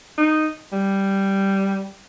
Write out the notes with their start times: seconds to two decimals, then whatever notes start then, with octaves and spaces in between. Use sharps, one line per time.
0.18 D#4
0.73 G3